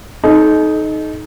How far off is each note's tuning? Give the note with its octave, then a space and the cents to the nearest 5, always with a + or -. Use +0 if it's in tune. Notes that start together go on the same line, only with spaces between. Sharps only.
D#4 +0 A4 -40